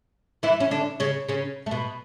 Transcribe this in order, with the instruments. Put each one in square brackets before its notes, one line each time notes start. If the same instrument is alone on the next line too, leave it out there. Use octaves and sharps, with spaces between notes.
[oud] E3 E4
C#4
D3 D4
C#3 C#4
C#3 C#4
A3
B2 B3